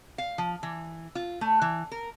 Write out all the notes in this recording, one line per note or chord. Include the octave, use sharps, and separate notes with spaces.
F5
F3
E3
F4
A3
E3
A#4